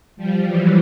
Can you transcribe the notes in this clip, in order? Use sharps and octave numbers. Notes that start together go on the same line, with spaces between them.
F3 G3
E3 F#3